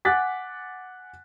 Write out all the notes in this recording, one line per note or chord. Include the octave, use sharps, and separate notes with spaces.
F#5 G#5 D6 F#6 A6 B6